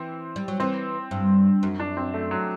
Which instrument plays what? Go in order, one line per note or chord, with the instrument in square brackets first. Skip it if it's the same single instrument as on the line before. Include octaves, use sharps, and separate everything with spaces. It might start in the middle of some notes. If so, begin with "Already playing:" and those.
Already playing: [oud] E3 [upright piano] C4
[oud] G3
F#3
[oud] E3 [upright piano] C4
[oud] G2
F#2
[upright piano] D4
C4
A3
F#3